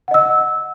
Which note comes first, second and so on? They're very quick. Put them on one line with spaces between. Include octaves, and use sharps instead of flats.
F#5 D#5 E6